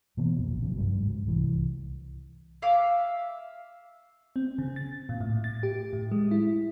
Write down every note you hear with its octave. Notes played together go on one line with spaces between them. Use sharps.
B2 E3 A#3 B3
A#1 F2
G#1 C#3 F#3
C#2 G2 G3
G#2
C2 E3
E5 F5 D6
C4
C#3
A6
A#2
A2
A6
G4
A2
G#3
E4